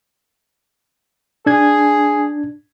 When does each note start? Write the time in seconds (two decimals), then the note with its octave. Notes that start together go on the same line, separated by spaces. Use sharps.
1.46 D4 G#4 G#6